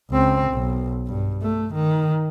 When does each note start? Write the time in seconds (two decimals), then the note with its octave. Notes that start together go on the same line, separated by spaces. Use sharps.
0.10 C#2 C4
0.52 B1
1.07 G2
1.42 A3
1.74 D#3